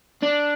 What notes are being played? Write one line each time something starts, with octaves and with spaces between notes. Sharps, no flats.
D4